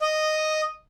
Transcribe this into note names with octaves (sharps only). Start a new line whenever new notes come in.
D#5